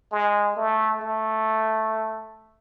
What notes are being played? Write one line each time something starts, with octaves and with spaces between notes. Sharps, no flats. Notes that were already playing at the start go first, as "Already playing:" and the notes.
G#3
A3
A3